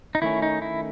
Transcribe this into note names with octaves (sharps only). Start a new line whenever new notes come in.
D#4
D#3 A3 C#4 E4
D#4
E4